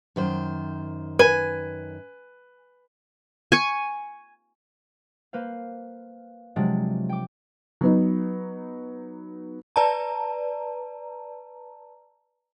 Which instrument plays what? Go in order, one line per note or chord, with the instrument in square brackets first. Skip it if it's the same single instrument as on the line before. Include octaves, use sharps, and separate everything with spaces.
[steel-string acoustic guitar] F#2 D#3 C5
[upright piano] B4 [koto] G#5
[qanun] G#5 C#6
[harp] A#3 B4 C5 F5
C3 F3 F#3 G#3 D4
G5 D6
[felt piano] F#3 B3 D#4
[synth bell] B4 D5 A5 A#5